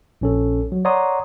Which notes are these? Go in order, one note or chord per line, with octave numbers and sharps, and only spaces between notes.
A#1 C#4 A4
F#3
C#5 D5 F#5 A#5 C6 D#6